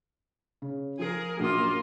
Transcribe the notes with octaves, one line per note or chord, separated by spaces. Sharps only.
C#3
F3 G#4 A#4
A#1 F#2 A#3 F4 D#6